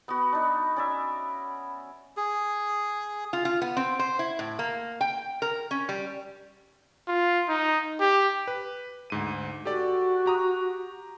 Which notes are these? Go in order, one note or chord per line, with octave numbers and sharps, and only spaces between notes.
B3 F#4 B5 D#6
D4 D#4
C#4 D5 E5
G#4
F4
F4
B3
C4
C5
E4
A2
A#3
G5
A#4
C#4
G3
F4
D#4
G4
B4
D2 G#2 D#7
F#4 G4 A4 D5
G4 A#5 D#6